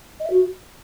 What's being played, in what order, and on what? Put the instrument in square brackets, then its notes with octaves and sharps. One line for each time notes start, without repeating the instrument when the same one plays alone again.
[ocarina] D#5
E5
F#4